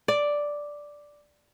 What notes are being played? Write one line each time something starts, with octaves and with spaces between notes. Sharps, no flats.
D5